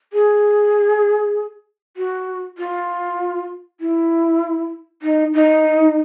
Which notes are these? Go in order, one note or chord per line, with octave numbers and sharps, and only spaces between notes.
G#4
F#4
F4
E4
D#4
D#4